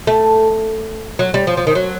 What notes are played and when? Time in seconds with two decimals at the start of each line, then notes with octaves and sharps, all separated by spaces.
0.07 A3
1.19 F#3
1.34 G3
1.47 F3
1.57 F3
1.67 D#3
1.75 F#3